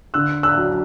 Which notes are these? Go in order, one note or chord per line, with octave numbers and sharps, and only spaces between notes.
D3 E6 F#6
E6 F#6
F#3